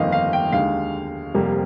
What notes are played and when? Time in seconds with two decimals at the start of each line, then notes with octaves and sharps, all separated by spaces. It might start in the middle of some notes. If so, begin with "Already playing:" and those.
Already playing: G1 F2 D#3 A#3 D#5 F5
0.12 F5
0.33 G5
0.52 D#2 D3 G#3 F5
1.34 F1 F2 C3 G3 A#3